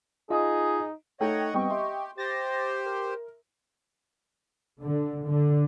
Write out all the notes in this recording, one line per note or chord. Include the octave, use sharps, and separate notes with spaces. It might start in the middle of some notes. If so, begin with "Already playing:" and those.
D#4 F4 G#4 D#5
A3 D#4 A4 C#5 D#5 F#5 G5
G3 B3 C4 D#5 G5 C#6
G4 E5 C6
G4 C5 A6 A#6
A#4
D3
D3